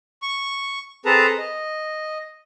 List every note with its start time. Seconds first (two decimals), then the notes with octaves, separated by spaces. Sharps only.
0.22 C#6
1.05 C4 G#4 A4 B4 A5 A#5
1.38 D#5